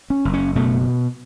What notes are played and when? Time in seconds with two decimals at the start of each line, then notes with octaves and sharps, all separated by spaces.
0.10 C#4
0.25 F#1
0.33 C#4
0.55 B2 A3